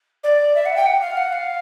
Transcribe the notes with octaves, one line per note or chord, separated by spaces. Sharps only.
D5
E5
F#5
G5
F#5
F5
F#5
F5